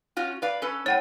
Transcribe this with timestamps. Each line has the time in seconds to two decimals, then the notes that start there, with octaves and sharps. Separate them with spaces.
0.17 C#4 F4 F#4
0.42 B4 D5 F5
0.62 C#4 A4 B4
0.86 A2 C#5 F#5 G5